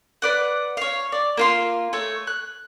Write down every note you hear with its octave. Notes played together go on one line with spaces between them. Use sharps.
B4 D5 F#5
C#5 F5
D5
A#3 F4 C6
A3 C#5
F#6